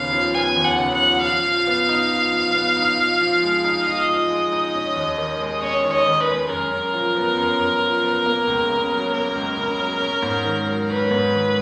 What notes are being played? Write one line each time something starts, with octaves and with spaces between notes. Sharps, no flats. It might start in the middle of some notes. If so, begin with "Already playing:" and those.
Already playing: D#2 C#3 B3 F5
F3
B3 G#5
D#2
F#5
C#3
F#5
F3
F3 F5
F3
B3
D#4
F3
F3
B3
D#4
F3
F3
G#3
D#4
F3 D#5
F3
G#3
D#4
C#4
D#2
D#3
G#3
C#4 C#5
D#2
D#5
D#3
B4
G#3
F#2 A#4
F#2
F3
B3
F#2
F#2
F3
B3
A#3
C#2
C#3
F#3
A#3 A#4
C#2
C#3
F#3
C#4
G#2
D#3
F#3
C#4 B4
G#2
D#3